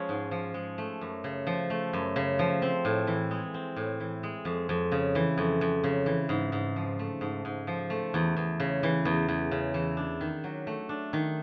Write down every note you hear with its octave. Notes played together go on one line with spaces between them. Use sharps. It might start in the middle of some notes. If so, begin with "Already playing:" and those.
Already playing: F3 G#3 C#4
G#2
F3
G#3
A3
F#2
C#3
F3
A3
F#2
C#3
F3
C4
A2
E3
G#3
C4
A2
E3
G#3
F2
F2
C#3
E3
F2
F2
C#3
E3
G#2
G#2
F3
A3
G#2
G#2
F3
A3
E2
E2
C#3
E3
E2
E2
C#3
E3
D4
D#3
F#3
A3
D4
D#3